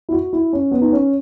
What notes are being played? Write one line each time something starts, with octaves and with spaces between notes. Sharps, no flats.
E4
F#4
E4
C#4
B3
D#4
C#4